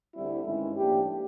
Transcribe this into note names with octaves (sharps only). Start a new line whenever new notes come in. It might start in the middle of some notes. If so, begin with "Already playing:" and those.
D2 D3 G3 C4 E4
G2 D#3 G#3 C#4 E4
A2 F3 A#3 D4 G4